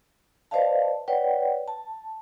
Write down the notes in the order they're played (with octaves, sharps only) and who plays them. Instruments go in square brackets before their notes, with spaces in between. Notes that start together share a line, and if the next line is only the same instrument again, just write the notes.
[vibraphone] B4 C5 D5 D#5 F5 A5
B4 C#5 D5 F#5 G5
A5